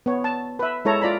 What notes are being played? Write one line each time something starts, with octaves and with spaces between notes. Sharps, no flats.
B3 C#5
A5
B4 E5
G#3 E4 A4 C#5 A#5
F4 D5 A#5 B5